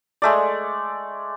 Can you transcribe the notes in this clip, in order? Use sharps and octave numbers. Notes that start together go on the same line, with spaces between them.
G#3 A3 D5